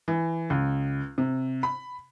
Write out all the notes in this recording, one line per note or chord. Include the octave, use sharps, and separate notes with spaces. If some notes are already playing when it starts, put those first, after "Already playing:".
E3
C#2
C3
B5